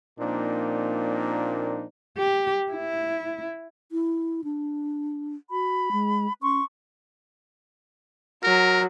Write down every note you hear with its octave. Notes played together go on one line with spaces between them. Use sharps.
A#2 F3 A#3 C4 D4 D#4
G4
E4
E4
D4
F#4 B5
G#3
C#4 C6 C#6
F#3 A#4